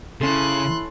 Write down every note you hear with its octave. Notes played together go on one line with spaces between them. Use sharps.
C#3 C#4 E4 A4 C6 F#6